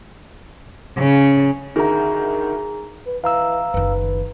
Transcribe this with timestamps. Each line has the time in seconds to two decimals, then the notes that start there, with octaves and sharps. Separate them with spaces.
0.97 C#3
1.76 D2 D#3 G#4 A#5
3.07 B4
3.24 E3 F5 A#5 E6
3.74 F#1 D#3 B4